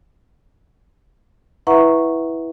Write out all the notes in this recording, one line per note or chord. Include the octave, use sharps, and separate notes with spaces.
E4 B4 E5 F#5 A#5 C#6